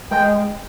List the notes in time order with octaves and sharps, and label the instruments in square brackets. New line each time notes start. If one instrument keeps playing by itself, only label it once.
[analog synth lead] G#3 [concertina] G5